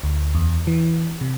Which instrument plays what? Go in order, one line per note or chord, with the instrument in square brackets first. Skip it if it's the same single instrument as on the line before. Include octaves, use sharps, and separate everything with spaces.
[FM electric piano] D2
E2
E3
C3